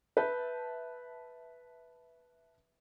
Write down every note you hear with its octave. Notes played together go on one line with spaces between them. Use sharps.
B4 E5 A5 G6